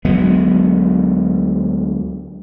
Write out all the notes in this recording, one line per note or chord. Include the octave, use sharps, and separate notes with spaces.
D2 F#3 G#3 B3